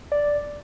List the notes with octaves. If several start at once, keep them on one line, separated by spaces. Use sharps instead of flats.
D5